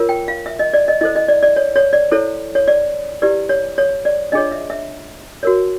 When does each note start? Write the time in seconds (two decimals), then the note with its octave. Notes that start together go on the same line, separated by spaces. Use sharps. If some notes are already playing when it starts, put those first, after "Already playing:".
Already playing: F4 A#4 C#5
0.09 G5
0.28 F5
0.46 E5
0.59 D#5
0.74 D5
0.88 D#5
1.01 E4 A4 C5 D#5
1.15 D#5
1.28 D5
1.43 D5
1.56 C#5
1.76 C#5
1.93 D5
2.11 E4 A4 C5 C#5
2.55 C#5
2.68 D5
3.22 E4 G4 B4 D5
3.49 C#5
3.78 C#5
4.05 D5
4.32 D4 F4 G#4 C#5 D#5
4.52 E5
4.70 E5
5.43 F#4 A#4 C#5